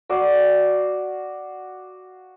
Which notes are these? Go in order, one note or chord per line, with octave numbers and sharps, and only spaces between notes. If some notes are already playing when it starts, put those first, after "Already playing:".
F#4 D5 F5